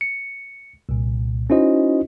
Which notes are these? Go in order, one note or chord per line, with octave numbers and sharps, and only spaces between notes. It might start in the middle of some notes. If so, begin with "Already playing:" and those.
C#7
C2 A#2
C#4 D#4 E4 F#4 C5 D#5